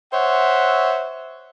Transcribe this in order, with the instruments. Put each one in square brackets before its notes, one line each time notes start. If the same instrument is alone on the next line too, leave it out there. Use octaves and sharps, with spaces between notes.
[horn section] C5 C#5 E5 F#5